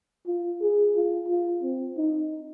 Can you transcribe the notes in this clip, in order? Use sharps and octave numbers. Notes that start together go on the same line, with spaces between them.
F4
G#4
F4
F4
C4
D#4